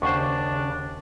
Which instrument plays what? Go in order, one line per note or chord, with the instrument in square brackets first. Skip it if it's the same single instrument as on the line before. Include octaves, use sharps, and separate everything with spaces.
[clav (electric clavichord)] D#2 C5 [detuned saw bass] C#3 [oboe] D4 [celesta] F#5 C#6 D6